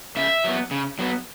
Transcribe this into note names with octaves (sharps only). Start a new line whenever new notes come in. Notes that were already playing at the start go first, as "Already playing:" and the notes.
C#3 E5
F#3 B3
C#3
F#3 B3